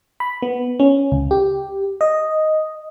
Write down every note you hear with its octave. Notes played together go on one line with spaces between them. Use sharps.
B5
B3
C#4
C#2
G4
D#5